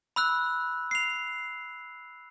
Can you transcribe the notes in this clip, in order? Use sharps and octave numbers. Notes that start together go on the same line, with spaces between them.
B5 E6 F#6
C7 F7